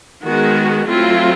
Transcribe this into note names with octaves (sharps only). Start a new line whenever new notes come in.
D#3 G#3 B3 F#4
F#3 A3 C4 E4 F4